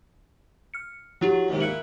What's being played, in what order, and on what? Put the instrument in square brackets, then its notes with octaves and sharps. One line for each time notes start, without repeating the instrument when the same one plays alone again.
[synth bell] F6 C#7
[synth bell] F3 E4 G4 [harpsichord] F#3
[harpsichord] D#2 G#2 C3
[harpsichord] A#2 E4 [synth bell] F#6 C#7 F#7